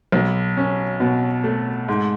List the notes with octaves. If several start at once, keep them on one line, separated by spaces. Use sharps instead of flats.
B1
C#4
B2
A3
G#2